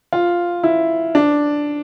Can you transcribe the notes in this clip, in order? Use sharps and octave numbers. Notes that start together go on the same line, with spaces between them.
F4
E4
D4